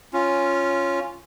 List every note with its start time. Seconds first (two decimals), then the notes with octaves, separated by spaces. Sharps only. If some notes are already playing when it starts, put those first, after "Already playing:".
0.13 C#4 F4